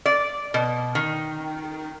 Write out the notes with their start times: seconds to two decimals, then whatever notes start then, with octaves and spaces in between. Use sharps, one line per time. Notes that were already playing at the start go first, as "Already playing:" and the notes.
0.06 D5
0.54 B2
0.95 D#3